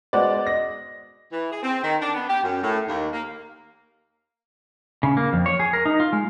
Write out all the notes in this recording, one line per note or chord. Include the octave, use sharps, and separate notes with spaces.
G#3 B3 F#4 C5 D5
D#5 A#6
E3
G#4
C4
D#3
D4
B3
G4
F#2
A2
D#2
A#3
C#3
A#3
F2
C#5
G#4
A#4
D#4
F4
G#3